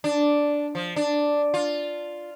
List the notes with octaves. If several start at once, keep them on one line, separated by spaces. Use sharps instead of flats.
D4
F3
D4
F4